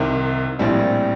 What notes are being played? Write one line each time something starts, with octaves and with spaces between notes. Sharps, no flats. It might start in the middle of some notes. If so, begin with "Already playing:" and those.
Already playing: C2 C3 D#3
A#1 A2 G3 C4